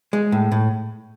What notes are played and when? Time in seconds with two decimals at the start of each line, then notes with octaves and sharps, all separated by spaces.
0.13 G#3
0.32 A2
0.52 A2